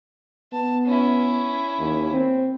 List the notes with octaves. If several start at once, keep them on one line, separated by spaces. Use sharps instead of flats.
B3 A5
C#4 E4
D#2
C4